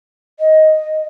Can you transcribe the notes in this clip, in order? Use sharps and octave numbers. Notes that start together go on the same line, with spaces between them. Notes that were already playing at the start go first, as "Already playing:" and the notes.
D#5